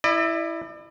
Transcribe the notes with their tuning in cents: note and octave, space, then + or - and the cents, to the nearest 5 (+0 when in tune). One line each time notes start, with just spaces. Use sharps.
E4 +0 D5 +45